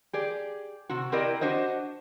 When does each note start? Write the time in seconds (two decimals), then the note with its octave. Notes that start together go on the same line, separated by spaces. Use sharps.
0.13 G4 G#4 D5
0.89 C3 F#4
1.12 C4 E4 G4 A#4 D5 D#5
1.41 D4 F#4 C5 D#5